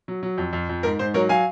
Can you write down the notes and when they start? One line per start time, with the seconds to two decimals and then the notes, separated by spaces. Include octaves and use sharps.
0.08 F#3
0.23 F#3
0.38 F2
0.53 F2
0.69 F2
0.83 G#2 A#4
0.99 G#2 C5
1.14 F#3 A#4 C#5
1.29 F#3 F5 G#5